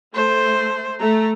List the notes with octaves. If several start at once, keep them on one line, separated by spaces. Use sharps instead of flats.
A3 C5
A3 A#5